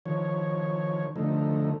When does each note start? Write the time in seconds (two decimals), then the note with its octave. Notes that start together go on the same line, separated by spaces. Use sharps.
0.06 D#3 F3 C#5
1.16 D3 F3 A3 D#4